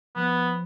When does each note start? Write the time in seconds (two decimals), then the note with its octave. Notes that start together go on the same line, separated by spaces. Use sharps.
0.16 F3 B3